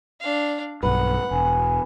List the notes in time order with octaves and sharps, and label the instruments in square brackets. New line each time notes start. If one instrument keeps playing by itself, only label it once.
[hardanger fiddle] D4 F5
[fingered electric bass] B1 G2 [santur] B4 [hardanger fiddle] F#5
[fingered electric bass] E1 [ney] G#5